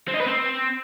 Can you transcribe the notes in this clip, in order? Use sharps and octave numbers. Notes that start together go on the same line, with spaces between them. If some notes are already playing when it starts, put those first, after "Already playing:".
C4
D#4
B4
C4